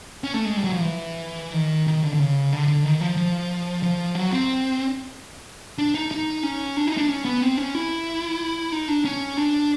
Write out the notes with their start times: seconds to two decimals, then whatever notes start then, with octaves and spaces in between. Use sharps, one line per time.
0.24 C#4
0.34 A3
0.45 G#3
0.57 G3
0.64 F#3
0.73 F3
0.81 E3
1.53 D#3
1.87 D#3
2.03 D3
2.14 D3
2.19 C#3
2.53 D3
2.68 D3
2.84 D#3
3.01 F3
3.17 F3
3.83 F3
4.15 F#3
4.32 C4
5.78 D4
5.95 D#4
6.11 D#4
6.43 C#4
6.77 D4
6.87 D#4
6.98 D4
7.09 C#4
7.25 B3
7.42 C4
7.57 C#4
7.75 E4
8.72 D#4
8.88 D4
9.05 C#4
9.37 D4